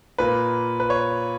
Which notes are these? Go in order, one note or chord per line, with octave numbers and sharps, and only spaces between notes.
A#2 A#3 B4
B4
C#5